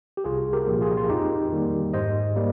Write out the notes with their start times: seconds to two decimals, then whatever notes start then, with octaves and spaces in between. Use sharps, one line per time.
0.17 G4
0.24 C2 F4 G#4
0.53 G4 A#4
0.66 A#2 F3 A#3
0.81 F4 G#4
0.97 F4
1.10 F2 D#4 G4
1.52 D#3 G3 A#3
1.94 G#2 C5 D#5
2.36 G3 A#3